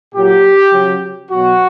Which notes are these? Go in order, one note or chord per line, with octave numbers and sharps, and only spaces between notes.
A#2 F#3 G4
C#3 F#3
B2 F#3 F#4